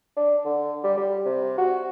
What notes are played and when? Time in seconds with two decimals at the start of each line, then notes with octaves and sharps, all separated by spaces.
0.17 D4
0.45 D3
0.84 G3
0.97 G3
1.26 C3
1.58 F#4